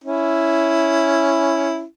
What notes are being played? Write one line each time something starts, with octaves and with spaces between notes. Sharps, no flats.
C#4 E4